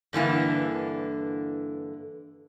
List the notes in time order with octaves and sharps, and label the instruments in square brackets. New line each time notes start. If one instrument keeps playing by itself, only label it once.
[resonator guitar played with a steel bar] G2 D3 E3 A#3